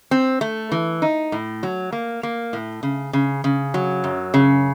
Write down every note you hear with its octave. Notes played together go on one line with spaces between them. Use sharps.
C4
A3
E3
D#4
A2
F#3
A#3
A#3
A2
C#3
C#3
C#3
F#3
F#2
C#3